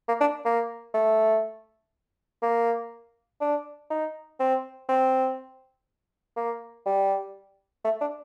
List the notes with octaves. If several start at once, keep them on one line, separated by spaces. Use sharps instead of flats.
A#3
D4
A#3
A3
A#3
D4
D#4
C4
C4
A#3
G3
A3
D4